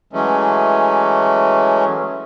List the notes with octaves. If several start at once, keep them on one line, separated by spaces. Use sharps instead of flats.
E3 F#3 G#3 A3 C#4